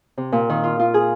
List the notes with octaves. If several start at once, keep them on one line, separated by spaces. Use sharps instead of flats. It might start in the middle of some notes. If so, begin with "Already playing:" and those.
C3
A#2
D#3
F4
F4
G#4